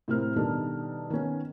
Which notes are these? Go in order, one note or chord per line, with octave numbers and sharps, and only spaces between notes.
A2 C3 C4 A#4 F6
B2 D#3 G3 D4 D#4 A4
D#3 B3 C#4